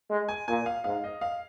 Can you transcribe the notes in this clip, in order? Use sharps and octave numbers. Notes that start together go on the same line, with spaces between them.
G#3
G#5
A#2 G#5
F5
G#2 F5
D#5
F5